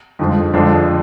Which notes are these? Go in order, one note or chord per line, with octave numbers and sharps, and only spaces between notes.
F2 D3 F3 G#3
F2 D3 F3 G#3 D4